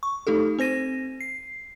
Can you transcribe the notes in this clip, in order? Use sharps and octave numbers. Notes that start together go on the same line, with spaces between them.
C#6
A3 D#4 G4 A4
C4 C5 A#6 D#7
C7